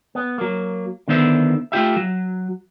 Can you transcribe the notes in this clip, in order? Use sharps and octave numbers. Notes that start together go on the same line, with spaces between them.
B3
F#3 A#3
D3 D#3 B3 C5 E5
A3 F4 G4 E5
F#3